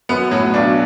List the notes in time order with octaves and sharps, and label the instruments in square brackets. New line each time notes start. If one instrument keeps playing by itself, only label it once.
[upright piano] F#2 [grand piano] B3
[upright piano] A2 [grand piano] F#3
[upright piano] A2
[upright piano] B1 B2 [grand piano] D4